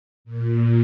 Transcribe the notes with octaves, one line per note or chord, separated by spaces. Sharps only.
A#2